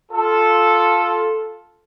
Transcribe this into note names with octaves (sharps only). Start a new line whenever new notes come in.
F4 A4